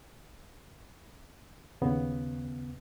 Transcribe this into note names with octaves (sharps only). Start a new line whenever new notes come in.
D#2 C#3 B3